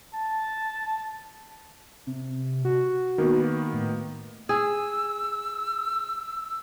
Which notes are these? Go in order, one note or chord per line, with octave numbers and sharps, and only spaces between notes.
A5
C3
F#4
D#3 A#3 B3
A2
G#4 E6